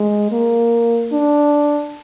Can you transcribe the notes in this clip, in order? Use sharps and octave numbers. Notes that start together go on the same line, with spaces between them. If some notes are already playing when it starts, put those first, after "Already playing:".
Already playing: G#3
A#3
D4